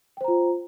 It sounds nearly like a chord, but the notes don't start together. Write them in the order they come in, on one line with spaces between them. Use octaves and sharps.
G5 C5 A#5 F4